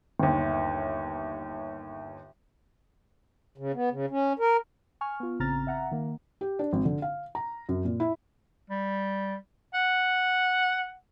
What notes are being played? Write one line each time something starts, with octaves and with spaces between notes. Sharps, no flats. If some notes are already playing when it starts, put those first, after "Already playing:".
G1 D#2
C#3
B3
C#3
C#4
A#4
G#5 C#6 F6
B3 F4
A1 C#3 C4 A#5 F6 A6
E5 F#5 A#5
D#3 A#3
G4
D4
G#1
D3
F5
A#5
F#2
A#2
E4
G3
F#5